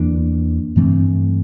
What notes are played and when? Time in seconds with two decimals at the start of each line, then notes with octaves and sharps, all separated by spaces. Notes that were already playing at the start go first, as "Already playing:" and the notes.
Already playing: E2 E3 A#3 D4
0.76 G2 E3 A3 C4